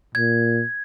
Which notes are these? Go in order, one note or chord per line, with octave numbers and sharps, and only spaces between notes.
A#2 G#6